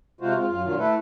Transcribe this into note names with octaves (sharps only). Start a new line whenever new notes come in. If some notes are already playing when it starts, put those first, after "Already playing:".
C3 G#3 F4 F#4 C5
G#3 C4 F4
F#2 F4
A#2 D3 D#3 F#3 F4
A3 E4 A4 B4